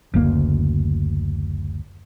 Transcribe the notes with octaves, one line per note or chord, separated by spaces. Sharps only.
F#1 D2 A#3